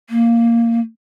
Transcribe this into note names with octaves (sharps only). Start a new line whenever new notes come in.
A#3